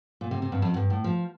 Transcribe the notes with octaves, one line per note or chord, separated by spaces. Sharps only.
A#2
C3
C3
G2
F2
G2
A2
F3